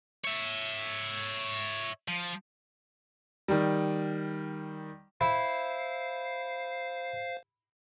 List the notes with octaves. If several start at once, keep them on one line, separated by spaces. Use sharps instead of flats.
C#5 E5
F3
D#3 G3
E4 C5 F5 C7